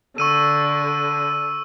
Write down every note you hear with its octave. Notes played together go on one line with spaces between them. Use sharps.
D3 C#6 E6 D#7